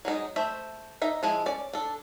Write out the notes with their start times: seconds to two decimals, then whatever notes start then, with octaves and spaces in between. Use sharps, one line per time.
0.05 F#3 G#3 D#4
0.36 A3 C5 E5
1.02 D#4 E5 A#5
1.23 F3 G#3 E4
1.46 C#4 D5
1.73 D4 A4